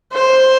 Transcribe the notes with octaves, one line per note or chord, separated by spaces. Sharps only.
C5